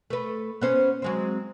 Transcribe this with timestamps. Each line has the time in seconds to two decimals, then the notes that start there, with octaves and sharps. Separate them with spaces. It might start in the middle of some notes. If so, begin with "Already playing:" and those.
0.10 A3 B4
0.61 B3 C#4 C5
1.02 F#3 G#3 C4